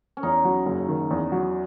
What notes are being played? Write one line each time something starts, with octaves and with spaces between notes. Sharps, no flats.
C#4
E2 D#4
F#3
F#1
D#3
E2
F#3